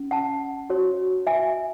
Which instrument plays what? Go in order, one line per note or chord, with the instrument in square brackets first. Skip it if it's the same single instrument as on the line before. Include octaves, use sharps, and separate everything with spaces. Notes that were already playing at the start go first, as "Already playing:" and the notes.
Already playing: [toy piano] C#4
F#5 A5
F#4 C#5
E5 G#5